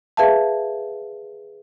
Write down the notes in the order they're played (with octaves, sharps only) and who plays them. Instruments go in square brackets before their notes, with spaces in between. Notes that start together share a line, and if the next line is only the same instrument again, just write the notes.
[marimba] G#4 B4 E5 F5 A5